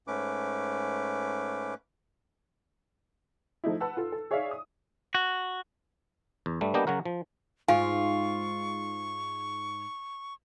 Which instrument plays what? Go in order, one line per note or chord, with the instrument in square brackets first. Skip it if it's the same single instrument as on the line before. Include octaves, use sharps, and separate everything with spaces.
[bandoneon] G#2 A3 C#4 B4 D6
[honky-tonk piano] F3 A3 D#4 E4
B4 F#5 A5 E6
F4 A4
A4
G#4 C#5 D5 E5 F5
D#6
[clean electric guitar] F#4
[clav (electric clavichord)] E2
G2 G3 A3
G3 A#3 B3 D4 G4 D#5
C#3 F#3 F#4 A#4
F3
[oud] G#2 [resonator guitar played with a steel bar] F4 [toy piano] F5 G#5 [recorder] C#6